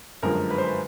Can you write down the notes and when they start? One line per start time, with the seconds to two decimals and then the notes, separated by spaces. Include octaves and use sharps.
0.22 G1 F#2 D3 F3 G#3 A#4
0.50 B4
0.58 C5
0.65 B4